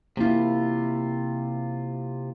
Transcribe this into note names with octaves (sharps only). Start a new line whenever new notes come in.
C3 A#3 E4 F4